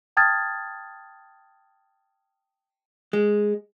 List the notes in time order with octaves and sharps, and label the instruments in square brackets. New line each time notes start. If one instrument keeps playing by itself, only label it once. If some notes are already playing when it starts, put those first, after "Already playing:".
[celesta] G5 A5 D#6 F6 G#6 A6
[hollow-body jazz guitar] G#3